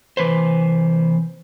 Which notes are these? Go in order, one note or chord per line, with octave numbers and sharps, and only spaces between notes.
C3 E3 B4 C5